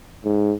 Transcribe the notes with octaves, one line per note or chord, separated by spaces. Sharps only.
G#2